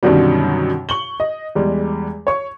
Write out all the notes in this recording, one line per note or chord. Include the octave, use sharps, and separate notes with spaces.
F#2 B2 D3 D#3 F#3 G3
C#6 F#7 G7
D#5
E2 G3 G#3
C#5 C#6